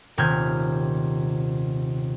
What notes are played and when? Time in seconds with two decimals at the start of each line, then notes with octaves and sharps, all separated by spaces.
0.18 D#1 C3 F6 G6 G#6